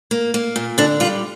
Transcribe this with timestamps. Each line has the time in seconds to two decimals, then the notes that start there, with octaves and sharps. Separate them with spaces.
0.11 A#3
0.34 A#3
0.56 A#2
0.78 D3 D4
1.00 G3 F4